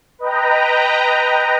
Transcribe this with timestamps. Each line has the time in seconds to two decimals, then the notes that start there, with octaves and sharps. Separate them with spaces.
0.19 B4 D#5 G5 A#5